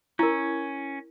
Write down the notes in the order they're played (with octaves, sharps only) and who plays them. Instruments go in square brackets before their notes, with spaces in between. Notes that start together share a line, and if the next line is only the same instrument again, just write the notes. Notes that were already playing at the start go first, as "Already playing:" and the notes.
[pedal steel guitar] C#4 [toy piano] E4 A#4